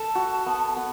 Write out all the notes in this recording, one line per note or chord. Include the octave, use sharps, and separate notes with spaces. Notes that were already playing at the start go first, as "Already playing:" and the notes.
Already playing: A4 A5
F#4
B3
B3